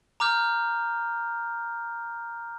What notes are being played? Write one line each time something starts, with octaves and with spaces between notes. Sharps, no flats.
A#5 D6 F6 G6